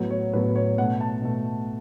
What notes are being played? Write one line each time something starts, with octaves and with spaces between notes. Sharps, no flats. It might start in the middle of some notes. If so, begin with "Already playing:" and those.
Already playing: A2 F#3 B3
C#5
A2 F#3 B3 B4
C#5
B2 A3 F#5
A5
B2 A3